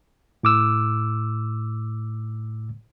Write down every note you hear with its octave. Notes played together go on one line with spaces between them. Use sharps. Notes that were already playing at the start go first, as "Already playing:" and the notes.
A2 D6 E6